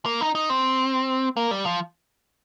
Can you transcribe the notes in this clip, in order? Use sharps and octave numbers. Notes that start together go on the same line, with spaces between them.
A#3
D#4
D#4
C4
A#3
G3
F3